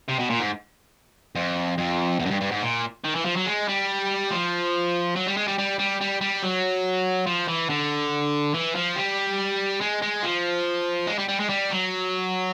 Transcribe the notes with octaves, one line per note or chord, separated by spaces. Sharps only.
C3
B2
A#2
G#2
F2
F2
E2
F#2
G2
G2
G#2
A#2
D#3
E3
F3
F#3
G#3
G3
F3
F#3
G3
G#3
G3
G3
G3
G3
G3
F#3
F3
E3
D3
E3
F3
G3
G#3
G#3
F3
G#3
G3
G3
G#3
G3
F#3